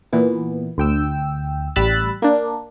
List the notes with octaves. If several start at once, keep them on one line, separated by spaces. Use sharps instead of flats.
A#2 E3 B3
D2 G5 E6
A1 G3 B5 E6 F#6 A6
A#3 D4